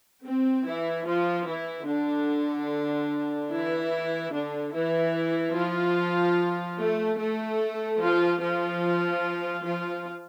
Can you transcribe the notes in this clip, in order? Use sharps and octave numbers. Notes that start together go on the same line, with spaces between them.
C4
E3 E4
F3 F4
E3 E4
D3 D4
E3 E4
D3 D4
E3 E4
F3 F4
A3 A4
A3 A4
F3 F4
F3 F4
F3 F4